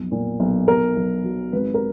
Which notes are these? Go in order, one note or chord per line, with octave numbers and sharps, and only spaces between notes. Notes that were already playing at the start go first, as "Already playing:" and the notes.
Already playing: B1 F2
A#2
B1
B1 A#4
B1
F#3
G#1 B4
A#4